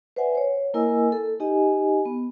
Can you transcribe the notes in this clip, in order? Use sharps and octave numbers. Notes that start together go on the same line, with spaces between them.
B4 C5 D5 E5 F#5 G#5
C5 C#5
A#3 E4 A#4 D#5 G#5 E6
A4
D#4 G4 D#5 G#5
B3